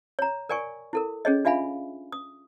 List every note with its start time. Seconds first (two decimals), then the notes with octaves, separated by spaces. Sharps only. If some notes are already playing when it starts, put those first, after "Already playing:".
0.19 C#5 A#5
0.49 A#4 D5 G5 G#5 C#6
0.93 E4 A4 A#4
1.25 C#4 G#4 C#5 D#5
1.45 D4 F4 E5 F5 G#5 B5
2.12 D#6